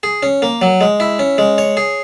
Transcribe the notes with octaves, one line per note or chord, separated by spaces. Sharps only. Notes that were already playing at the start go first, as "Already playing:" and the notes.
G#4
C#4
A#3
F#3
G#3
E4
C#4
G#3
C#5
G#4